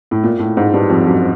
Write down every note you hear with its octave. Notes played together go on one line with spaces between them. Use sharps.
A2
A#2
A2
G#2
G2
F2
F#2